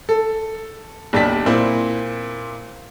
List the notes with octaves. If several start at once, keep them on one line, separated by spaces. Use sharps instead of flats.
A4
F#1 B1 D4 G4 A5 B6
A#2 C4 E4